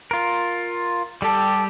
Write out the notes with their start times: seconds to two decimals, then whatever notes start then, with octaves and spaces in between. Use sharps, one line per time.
0.11 F4 A#4
1.22 G3 G4 A4